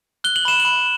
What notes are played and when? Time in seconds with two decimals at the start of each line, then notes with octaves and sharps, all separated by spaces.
0.24 F#6 G7
0.36 F#7
0.45 B5 E7
0.60 F#7
0.65 B5